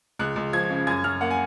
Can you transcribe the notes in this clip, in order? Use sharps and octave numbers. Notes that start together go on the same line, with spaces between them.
C#2 F#6
C#2
F3 G#6
C#3
F#2 G#6
F#2 F6
A#3 F#5
G#5